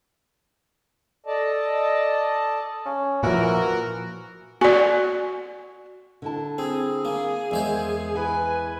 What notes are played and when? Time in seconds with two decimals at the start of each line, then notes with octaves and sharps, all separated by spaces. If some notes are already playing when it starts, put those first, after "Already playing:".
1.26 A4 D5 D#5 A5
2.85 C#4
3.23 A#2 E3 F3 F#4 A#4
4.61 F#4 D5 G#5
6.22 D3 E4 A5
6.58 C4 G#4
7.05 A#3 G#5
7.51 E2 D#3 G#3 C5
8.15 E3 B4 G#5